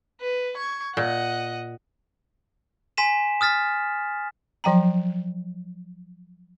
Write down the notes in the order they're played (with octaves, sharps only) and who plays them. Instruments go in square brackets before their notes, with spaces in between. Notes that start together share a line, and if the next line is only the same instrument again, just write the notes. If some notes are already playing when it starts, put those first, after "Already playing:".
[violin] B4
C#6 G#6
[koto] A#2 [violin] D#5 F#5
[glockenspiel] G#5 C6 B6 D#7 E7
D#6 F6 A6 B6
[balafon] F3 F#3 G5 A#5